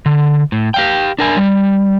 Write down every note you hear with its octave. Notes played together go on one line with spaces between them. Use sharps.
D3
A2
G4 F5 G5
D4 A#4 G#5
G3